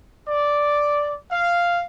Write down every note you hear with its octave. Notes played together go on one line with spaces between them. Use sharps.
D5
F5